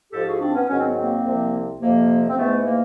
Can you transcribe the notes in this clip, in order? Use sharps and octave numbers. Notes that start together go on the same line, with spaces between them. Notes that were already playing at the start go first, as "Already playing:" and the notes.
G#2 F3 G4 A4
F#4 G#4
C4 D4
B3 C#4
G#2 D#3 F#3 C#4
C4
B3
A#3 C4
C2 C3 F3
F2 C3 F3 A#3
C4
G#2 E3 A3 B3
A#3